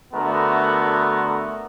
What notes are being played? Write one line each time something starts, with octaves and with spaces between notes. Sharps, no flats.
D3 A3 B3 F#4 A#4